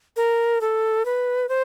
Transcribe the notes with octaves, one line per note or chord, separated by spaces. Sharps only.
A#4
A4
B4
C5